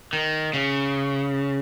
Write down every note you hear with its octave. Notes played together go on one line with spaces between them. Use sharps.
D#3
C#3